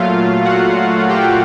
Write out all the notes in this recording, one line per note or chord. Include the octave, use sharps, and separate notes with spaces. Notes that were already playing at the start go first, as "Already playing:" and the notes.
Already playing: A#2 F#3 A3 F4 F5
F#4 F#5
G4 G5